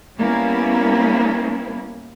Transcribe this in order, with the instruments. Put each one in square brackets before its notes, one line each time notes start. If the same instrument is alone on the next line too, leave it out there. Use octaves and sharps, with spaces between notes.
[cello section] G3 A#3 B3 C#4 E4